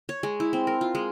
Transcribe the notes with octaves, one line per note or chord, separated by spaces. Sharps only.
C#5
G#3
E4
C4
A#4
F4
G#3